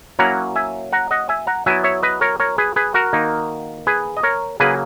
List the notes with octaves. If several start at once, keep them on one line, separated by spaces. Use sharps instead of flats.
F#3 A#3 C#4 E4 F#5 A#5
E5 G#5
F#5 A#5
D#5 F#5
E5 G#5
F#5 A#5
F#3 B3 E4 E5 G#5
C#5 E5
B4 D#5
A#4 C#5
A#4 C#5
G#4 B4
G#4 B4
F#4 A#4
D#3 A#3 D#4
G#4 B4
D#5
A#4 C#5
C#3 F#3 A#3 G#4 B4